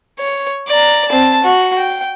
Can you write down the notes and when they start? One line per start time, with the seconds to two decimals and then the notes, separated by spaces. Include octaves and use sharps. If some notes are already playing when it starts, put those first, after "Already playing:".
0.19 C#5
0.68 D5 A#5
1.09 C4 A5
1.44 F#4
1.78 G5